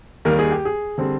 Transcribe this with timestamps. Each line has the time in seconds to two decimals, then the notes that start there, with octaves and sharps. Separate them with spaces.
0.25 D#2 D#3 G3 A#3 A#4
0.39 G#4
0.52 G4
0.65 G#4
0.98 D3 G3 C4